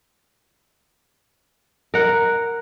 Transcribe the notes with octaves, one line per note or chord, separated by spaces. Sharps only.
A#4 F#5